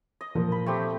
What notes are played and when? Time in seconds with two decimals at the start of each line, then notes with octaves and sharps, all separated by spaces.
0.21 D#5
0.35 A#2 F3 A#3
0.52 B5
0.66 A3 C4 G4